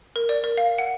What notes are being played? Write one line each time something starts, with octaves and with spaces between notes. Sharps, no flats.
A#4
D5
A#4
F5
F#5